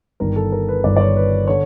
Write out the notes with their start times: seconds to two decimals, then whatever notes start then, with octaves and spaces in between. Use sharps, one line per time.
0.20 G1 G2 D#3 A#4
0.36 A4
0.52 A#4
0.68 B4
0.83 G1 G2 D#3 D5
0.96 D5
1.01 C#5
1.17 B4
1.48 D3 C#5